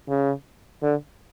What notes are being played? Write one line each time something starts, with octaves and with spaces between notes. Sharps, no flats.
C#3
D3